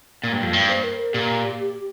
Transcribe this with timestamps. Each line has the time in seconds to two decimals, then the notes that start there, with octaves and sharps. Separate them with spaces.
0.23 A#2 A#3
0.33 G2
0.43 F2
0.53 G2
0.68 C5
0.84 A#4
0.98 A#4
1.14 A#2 G4